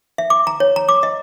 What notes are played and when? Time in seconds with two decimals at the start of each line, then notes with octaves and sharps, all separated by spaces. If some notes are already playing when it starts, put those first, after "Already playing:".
0.18 E5
0.30 D6
0.47 A#5
0.60 C#5
0.76 A#5
0.89 D6
1.03 D#5